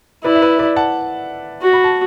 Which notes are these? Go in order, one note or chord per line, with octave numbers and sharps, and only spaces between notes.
E4 B4 D5
E5
B4 D5
B4 D5
F#5 A5
F#4
B5
A5